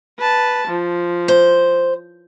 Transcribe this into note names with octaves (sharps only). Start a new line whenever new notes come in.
B4 A5
F3
C5